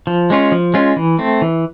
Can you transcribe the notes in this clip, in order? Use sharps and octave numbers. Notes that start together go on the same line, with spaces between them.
F3
G#3 C#4 F4
F3
G#3 C#4 F4
E3
A3 C4
E3